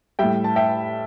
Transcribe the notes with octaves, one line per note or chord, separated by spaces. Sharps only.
A2 G3 E5 G5
A5
E5 G5